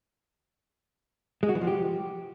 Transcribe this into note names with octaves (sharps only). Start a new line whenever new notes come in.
G#3
F#4
E3
F3
G4